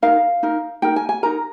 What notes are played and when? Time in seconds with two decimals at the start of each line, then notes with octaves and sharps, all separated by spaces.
0.02 D#4 A#4 F5
0.43 D#4 A#4
0.82 D#4 A#4 G5
0.96 G#5
1.09 G#5
1.23 D#4 A#4 A#5